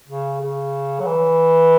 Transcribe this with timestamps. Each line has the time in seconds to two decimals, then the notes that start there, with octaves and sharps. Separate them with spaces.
0.08 C#3
0.41 C#3
1.00 F#3
1.06 E3